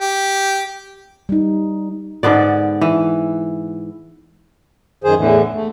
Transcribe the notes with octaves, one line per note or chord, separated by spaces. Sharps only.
G4
G3 D#4
G#2 D3 B3 D5
E3
F#2 D#3 G#4 C5
E2 A2 D3 E3
A3